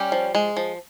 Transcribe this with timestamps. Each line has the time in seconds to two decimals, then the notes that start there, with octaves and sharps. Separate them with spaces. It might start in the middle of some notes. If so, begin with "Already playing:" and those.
Already playing: G3 C#4 G4
0.12 F3
0.35 G#3
0.57 F3